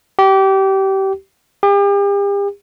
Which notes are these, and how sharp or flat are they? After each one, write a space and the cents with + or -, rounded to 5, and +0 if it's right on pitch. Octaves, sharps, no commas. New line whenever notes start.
G4 -25
G4 +40